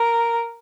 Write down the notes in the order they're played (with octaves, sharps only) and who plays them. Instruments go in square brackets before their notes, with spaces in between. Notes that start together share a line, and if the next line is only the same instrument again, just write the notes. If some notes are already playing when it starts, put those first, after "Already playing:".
Already playing: [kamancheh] A#4